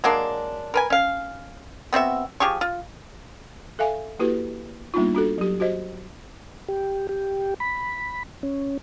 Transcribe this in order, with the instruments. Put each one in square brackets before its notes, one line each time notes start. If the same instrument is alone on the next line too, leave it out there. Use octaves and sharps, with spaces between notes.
[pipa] F#3 G#3 A#3 D4
A#4 B4 G#5
C#4 F5
B3 C4 F#4 E5
F3 G4 G#4 C#6
F4
[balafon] A4 E5 F5 G#5
A#3 E4 F#4 G4 A4 B4
G3 A#3 B3 D4 D#4 F4
D4 F#4 A4
F#3 G4
F#4 G4 C5 D#5
[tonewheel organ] G4
G4
B5
C#4